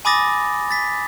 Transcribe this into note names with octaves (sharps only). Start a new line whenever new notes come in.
G#5 B5 D6 D#6 A6 A#6
A6 B6